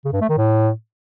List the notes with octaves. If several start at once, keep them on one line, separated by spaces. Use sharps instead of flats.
C#3
G2
A3
D#3
A2